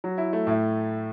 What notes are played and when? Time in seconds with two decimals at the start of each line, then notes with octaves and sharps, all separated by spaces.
0.04 F#3
0.18 E4
0.33 A3
0.47 A2